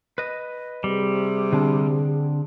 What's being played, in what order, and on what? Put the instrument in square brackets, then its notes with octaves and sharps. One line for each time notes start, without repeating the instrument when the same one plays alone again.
[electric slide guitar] B4 D#5
[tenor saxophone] C3 [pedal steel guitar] G3 [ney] G#4
[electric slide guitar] D3 C4 D4